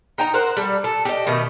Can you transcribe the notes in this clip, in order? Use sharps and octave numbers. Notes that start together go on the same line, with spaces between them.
D#4 G5 A#5
A#4 C5 F#5
G3 A4
A4
G4 D#5
B2 D#3 A3